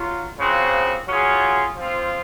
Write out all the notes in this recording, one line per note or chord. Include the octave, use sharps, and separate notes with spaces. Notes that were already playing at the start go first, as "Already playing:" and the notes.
Already playing: F#3 F4
C#3 F3 C4 F#4
F#3 C#4 F4 G#4
F3 C4 F4